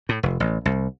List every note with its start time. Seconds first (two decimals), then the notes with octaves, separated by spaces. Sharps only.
0.09 A2
0.23 F1
0.40 A1
0.65 C2